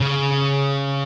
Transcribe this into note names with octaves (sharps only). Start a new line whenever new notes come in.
C#3